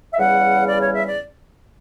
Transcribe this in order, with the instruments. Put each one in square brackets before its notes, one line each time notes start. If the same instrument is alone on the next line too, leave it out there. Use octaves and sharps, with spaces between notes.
[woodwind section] E5
E2 C#3 G3 F#5
D5
C#5
E5
D5